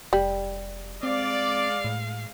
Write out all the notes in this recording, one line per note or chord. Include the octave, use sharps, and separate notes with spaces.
F1 G3
G#3 C4 D5 F5
A2